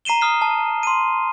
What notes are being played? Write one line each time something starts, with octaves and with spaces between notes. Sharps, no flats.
A#5 C7 D#7 E7 G7
D#6 F6 C7
A5
C6 D#7